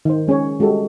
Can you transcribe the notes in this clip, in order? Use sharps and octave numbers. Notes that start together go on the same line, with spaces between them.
D#3 C5
G#3 C#4 G#4 C#5
G3 G#3 F#4 G4 A4